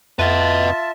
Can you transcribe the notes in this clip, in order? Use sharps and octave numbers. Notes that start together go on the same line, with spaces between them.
F2 F4 B4 D#5 E5 A5